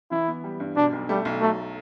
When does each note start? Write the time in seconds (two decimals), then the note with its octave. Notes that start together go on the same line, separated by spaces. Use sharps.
0.11 E3 E4
0.28 B3
0.44 G3
0.60 G2
0.76 B2 D4
0.92 B1
1.09 G3 A3
1.25 B1
1.41 F#3 A3